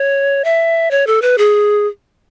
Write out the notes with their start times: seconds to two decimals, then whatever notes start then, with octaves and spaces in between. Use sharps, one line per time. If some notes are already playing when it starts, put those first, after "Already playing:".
Already playing: C#5
0.44 E5
0.91 C#5
1.07 A4
1.22 B4
1.38 G#4